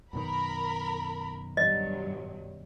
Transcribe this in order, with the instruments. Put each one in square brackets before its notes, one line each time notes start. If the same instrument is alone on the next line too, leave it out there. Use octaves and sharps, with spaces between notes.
[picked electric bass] F#2 B2 D#3 [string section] A#4 B5
[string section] G2 F#3 [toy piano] D#5